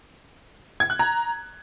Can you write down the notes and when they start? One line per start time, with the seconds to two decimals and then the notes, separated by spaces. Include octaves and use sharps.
0.80 G#6
0.90 F#6
0.99 A#5